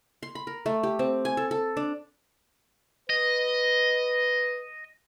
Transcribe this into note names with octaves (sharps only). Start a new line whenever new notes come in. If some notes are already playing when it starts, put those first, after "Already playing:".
C6
B5
A#4
A3
G4
C4
G#5
A4
A4
D4
B4 D#5